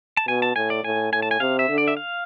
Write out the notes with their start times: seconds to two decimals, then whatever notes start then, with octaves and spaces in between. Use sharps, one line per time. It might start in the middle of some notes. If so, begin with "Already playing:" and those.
0.17 A5
0.28 B2 G#5
0.42 A5
0.56 A2 G#5
0.70 D5
0.84 A2 G#5
1.13 A2 G#5
1.22 A5
1.31 G#5
1.40 C3 F5
1.59 E5
1.69 D3
1.78 D5
1.88 E5
1.97 F5